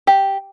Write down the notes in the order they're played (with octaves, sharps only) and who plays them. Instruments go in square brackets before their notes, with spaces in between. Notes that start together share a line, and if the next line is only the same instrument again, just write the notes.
[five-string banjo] G4